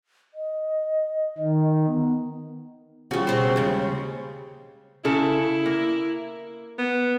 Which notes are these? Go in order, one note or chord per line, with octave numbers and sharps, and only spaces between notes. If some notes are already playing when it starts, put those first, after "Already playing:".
D#5
D#3
B3
C#3 G3 F4 F#4
B2 C4 C5
D#2 C#3 G3 G#3
C#3 E4 A4
A#3
B3